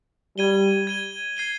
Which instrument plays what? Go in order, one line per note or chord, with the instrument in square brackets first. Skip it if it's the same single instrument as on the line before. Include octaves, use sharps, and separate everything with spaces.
[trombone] G3 [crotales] G#6 D#7 G7
[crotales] G#6 D#7 G7
G#6 C7 D#7 G7